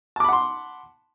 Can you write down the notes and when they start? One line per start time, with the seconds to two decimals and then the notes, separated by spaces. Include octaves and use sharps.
0.16 A5
0.20 D6
0.24 B5
0.29 F#5
0.33 C6